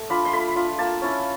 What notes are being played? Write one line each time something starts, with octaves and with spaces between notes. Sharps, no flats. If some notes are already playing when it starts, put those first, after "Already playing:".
Already playing: A3
D4 F4 B5
C6
A3 B5
D4 F4
A#3 A5
C#4 E4